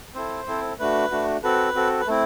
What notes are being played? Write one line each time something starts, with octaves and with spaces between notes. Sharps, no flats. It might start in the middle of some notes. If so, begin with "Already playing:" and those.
C4 E4 A4 C5
C4 E4 A4
A3 D4 F#4 B4
A3 D4 F#4
C4 F#4 A4 B4
C4 F#4 A4
B4
A3 C4 E4 A4